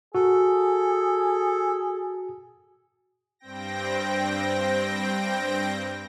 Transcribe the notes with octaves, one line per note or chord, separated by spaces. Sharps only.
F#4 G#4 A4
G2 C4 G5 A#6